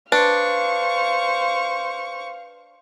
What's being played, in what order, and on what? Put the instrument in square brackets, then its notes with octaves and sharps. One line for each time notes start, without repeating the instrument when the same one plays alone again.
[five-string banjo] D4 [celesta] B4 [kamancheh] C5 C#6 [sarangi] F5